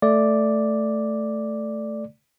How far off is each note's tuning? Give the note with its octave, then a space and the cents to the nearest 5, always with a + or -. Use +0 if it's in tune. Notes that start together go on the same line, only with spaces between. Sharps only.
A3 +0 D5 +0